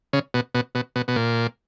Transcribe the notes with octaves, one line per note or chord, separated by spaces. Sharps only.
C#3
B2
B2
B2
B2
B2
A#2